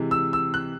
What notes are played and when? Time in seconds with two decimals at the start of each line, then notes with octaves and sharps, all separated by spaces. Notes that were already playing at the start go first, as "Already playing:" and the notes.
Already playing: C3 E3 G#3
0.11 E6
0.33 E6
0.54 F#6